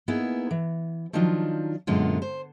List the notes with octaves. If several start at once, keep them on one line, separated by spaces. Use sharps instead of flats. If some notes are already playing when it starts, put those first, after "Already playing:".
A#3 B3 D#4 E4 G#4
E3
D#3 F3 F#3 D4 D#4 F4
F#2 A#2 D3 G#3 B3 F4
C5